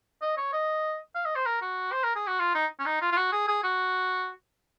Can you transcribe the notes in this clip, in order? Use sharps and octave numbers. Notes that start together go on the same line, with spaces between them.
D#5
C#5
D#5
F5
D#5
C5
A#4
F#4
C5
A#4
G#4
F#4
F4
D#4
C#4
D#4
F4
F4
F#4
G#4
G#4
F#4